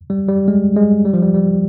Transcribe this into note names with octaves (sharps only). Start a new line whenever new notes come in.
G3
G3
G#3
G#3
G3
F3
G3
G3